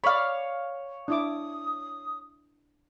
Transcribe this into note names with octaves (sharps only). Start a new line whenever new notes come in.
C#5 D5 F5 B5
D4 E4 D6 D#6